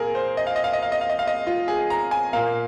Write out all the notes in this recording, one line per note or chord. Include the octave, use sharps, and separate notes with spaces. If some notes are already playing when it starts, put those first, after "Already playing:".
Already playing: A#2 G#4 A#4
C5
D#5
F5
D#5
F5
D#5
F5
D#5
F5
D#5
F5
D#5
F4
G#4
A#5
G#5
A#2 A#3 F5